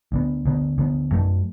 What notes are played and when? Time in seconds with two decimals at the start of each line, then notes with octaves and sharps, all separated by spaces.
0.12 D2 D3 B3
0.46 D2 D3 B3
0.78 D2 D3 B3
1.12 F#2 F#3 A3